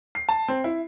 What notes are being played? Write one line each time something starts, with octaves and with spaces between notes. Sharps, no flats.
C7
A5
C4
E4